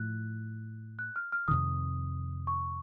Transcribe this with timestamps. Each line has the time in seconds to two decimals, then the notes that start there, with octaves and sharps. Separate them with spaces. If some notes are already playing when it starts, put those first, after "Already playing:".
Already playing: A2 F3 F#6
0.99 F#6
1.16 F6
1.32 F6
1.48 F2 C3 D#3 D#6
2.47 C#6